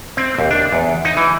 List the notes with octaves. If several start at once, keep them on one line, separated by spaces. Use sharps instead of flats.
C4
D#2
D4
E2
D#4
E3